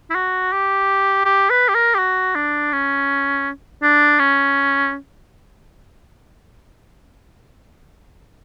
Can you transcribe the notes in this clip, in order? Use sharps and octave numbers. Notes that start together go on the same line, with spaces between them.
E4
F#4
G4
G4
B4
G4
A#4
G4
F#4
D4
C#4
D4
C#4